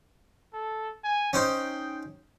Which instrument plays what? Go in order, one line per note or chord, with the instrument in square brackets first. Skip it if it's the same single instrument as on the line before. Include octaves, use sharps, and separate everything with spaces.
[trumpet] A4
G#5
[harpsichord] C#4 D#4 C5 [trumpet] G5